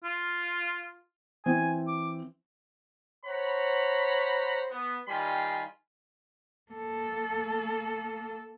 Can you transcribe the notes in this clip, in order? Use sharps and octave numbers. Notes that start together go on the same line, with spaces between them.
F4
E3 C4 G#5
D6
C5 C#5 F#5 A#5 B5
B3
D#3 G3 F4 G#5 B5 C6
A#3 A4